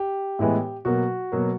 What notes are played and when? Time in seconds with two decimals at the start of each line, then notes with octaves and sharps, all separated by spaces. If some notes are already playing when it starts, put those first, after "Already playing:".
Already playing: G4
0.39 A2 E3 G#3 B3
0.85 B2 F#3 A#3 F#4
1.32 B2 F#3 A#3